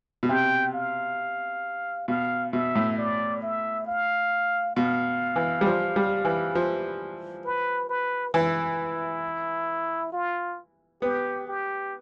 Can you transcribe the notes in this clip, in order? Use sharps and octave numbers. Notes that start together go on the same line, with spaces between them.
B2
C3 G5
F5
B2 F5
B2 E5
A2
D5
E5
F5
B2 F5
E3
G3
F3
G3
E3
F3
B4
B4
E3 E4
F4
B3 G4
G4